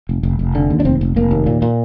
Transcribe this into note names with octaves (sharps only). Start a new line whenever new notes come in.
F1
F1
F1
D3
D#2
D4
F1 C4
F1
F1 A#3
D#2
A#2
A#2